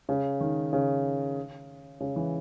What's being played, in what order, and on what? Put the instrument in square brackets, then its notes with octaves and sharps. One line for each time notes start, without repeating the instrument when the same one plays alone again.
[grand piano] C#3
D#3
C#3
C#3
E3